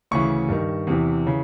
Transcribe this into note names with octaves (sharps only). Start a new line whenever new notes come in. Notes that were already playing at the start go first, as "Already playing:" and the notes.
D2 C#3 E3 C#6
G2 D#3
E2 C3 E3
C#3 E3